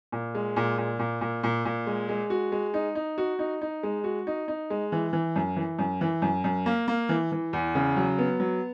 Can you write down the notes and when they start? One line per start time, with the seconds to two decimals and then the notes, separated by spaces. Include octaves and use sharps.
0.12 A#2
0.35 G#3
0.56 A#2
0.78 A#2
0.99 A#2
1.21 A#2
1.43 A#2
1.65 A#2
1.87 G#3
2.09 G#3
2.30 F#4
2.52 G#3
2.74 D#4
2.95 D#4
3.18 F#4
3.39 D#4
3.62 D#4
3.83 G#3
4.04 F#4
4.27 D#4
4.48 D#4
4.70 G#3
4.92 E3
5.13 E3
5.36 F#2
5.56 E3
5.79 F#2
6.01 E3
6.22 F#2
6.44 F#2
6.66 A#3
6.88 A#3
7.09 E3
7.32 E3
7.53 E2
7.75 C#3
7.97 F#3
8.18 B3
8.40 F#3